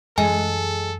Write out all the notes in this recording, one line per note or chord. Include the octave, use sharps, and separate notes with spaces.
F#2 E3 G#3 A4 G#5